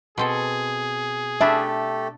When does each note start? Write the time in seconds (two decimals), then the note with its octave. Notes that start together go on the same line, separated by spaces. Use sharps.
0.18 B2 C4 G#4 A4
1.41 A3 D4 G4 A4 E5 B5 E6